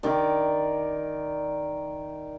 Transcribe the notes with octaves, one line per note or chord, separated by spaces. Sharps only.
D#3 D5